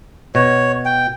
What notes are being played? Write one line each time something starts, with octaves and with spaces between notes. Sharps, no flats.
B2 C#5
G5